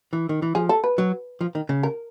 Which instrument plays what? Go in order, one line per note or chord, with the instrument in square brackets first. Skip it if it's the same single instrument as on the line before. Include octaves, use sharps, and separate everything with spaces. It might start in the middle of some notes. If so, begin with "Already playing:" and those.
[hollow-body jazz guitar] E3
D#3
E3
[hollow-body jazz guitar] F3 [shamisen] G#4
[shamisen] A4
B4
[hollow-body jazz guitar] F#3
F3
D#3
C#3
[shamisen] A#4